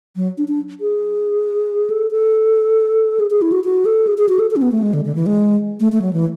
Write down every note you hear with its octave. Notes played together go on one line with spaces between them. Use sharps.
F#3
D4
D4
G#4
A4
A4
G#4
G#4
E4
F#4
F#4
A4
G#4
G#4
F#4
A4
A4
C#4
B3
A3
G#3
D3
D3
E3
G#3
A3
A3
F#3
E3